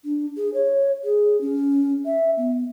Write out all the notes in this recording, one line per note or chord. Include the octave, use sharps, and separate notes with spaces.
D4
G#4
C#5
G#4
C#4
E5
B3